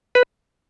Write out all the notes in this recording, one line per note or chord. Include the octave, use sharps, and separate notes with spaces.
B4